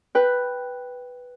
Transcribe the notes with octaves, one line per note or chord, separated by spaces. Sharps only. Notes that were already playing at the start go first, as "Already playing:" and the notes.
B4 G5